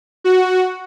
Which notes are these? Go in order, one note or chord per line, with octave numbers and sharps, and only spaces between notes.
F#4